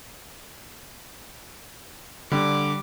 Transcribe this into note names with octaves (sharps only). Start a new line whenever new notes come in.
D3 G3 D6